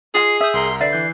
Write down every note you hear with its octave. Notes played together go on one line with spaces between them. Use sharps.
F4 G#4 D#5 G#5 C7
E5 D#6 E6 G6
C2 A#4 A#5 C6
D3 B4 D5 E5 C7
E3 F#6 G6